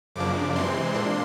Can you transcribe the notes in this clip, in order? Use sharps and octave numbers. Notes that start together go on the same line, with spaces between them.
F#2 C#3 F3 A#3 D4 D6
C3 E3 G#3 C4 C6
A#2 A#3 D4